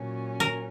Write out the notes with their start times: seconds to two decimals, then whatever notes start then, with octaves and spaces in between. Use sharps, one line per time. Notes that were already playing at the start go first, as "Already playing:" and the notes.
Already playing: A#2 F#3 C#4
0.40 A#4